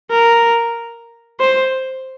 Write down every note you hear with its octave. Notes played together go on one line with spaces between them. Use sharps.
A#4
C5